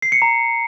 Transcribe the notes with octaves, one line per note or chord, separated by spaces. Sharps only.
C7
C#7
A#5